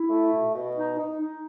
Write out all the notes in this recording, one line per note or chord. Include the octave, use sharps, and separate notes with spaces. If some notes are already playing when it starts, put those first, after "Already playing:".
Already playing: E4
A3
B2
B2
D#4
D#4
D#4